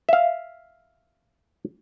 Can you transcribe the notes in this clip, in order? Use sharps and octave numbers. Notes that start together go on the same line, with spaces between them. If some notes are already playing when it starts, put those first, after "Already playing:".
E5 F5